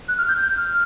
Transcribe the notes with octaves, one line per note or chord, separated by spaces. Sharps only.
F#6
F6
G6
G6
F6